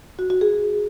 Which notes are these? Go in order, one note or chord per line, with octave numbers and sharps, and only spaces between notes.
F#4
F#4
G#4